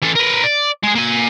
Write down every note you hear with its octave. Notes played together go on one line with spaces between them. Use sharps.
E3 A4
A#4 B4
D5
G#3 G#4
A#3 G#5